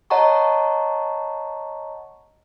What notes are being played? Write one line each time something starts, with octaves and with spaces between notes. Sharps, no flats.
C#5 D#5 F#5 A5 A#5 C#6